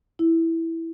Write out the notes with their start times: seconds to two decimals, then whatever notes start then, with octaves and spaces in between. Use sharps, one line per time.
0.19 E4